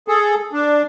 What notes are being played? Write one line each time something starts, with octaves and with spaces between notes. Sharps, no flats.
G#4 A4
D4